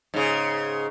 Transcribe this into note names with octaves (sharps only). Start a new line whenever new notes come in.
G#2 C#3